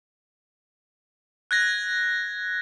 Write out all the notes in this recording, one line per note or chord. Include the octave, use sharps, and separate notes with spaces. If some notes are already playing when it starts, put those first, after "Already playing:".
F#6 G#6 A#6